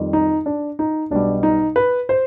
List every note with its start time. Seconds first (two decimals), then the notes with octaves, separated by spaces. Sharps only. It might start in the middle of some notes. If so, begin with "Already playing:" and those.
Already playing: F2 D#3 G3
0.13 D#4
0.46 D4
0.79 D#4
1.10 B1 B2 G3 D4
1.43 D#4
1.76 B4
2.09 C5